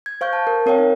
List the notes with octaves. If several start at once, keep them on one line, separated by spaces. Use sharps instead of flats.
G#6
C5 F5 C#6 G6
A5
A#4
C4 A#4 C#5 F5 G5
D#4